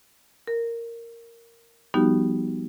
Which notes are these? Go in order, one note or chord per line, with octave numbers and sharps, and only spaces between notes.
A#4
F3 G3 B3 D#4 F#4 G4